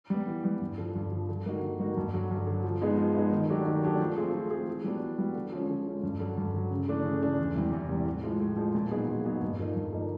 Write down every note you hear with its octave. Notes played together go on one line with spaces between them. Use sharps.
G3 B3
E3
G3 B3
G2
D3 F3
G2
D3 F3
D3
G3 A#3 D#4 F#4
D3
G3 A#3 D#4 F#4
G2
D3 F#3
G2
D3 F#3
F3
G#3 B3 D#4 G#4
F3
G#3 B3 D#4 G#4
D#3
F#3 A3 D4 G4
D#3
F#3 A3 D4 G4
F3
A3 C4 F4 G#4
F3
A3 C4 F4 G#4
E3
G3 B3 D4 F#4
E3
G3 B3 D4 F#4
D3
F3 G#3 C#4
D3
F3 G#3 C#4
G2
D3 F#3
G2
D3 F#3
C#3
E3 A3 D4
C#3
E3 A3 D4
E2
C3 E3 G3
E2
C3 E3 G3
A2
F3 G#3
A2
F3 G#3
A#2
F#3 B3 D#4 G#4
A#2
F#3 B3 D#4 G#4
G2
D3 F3 A#3 D#4
G2
D3 F3 A#3 D#4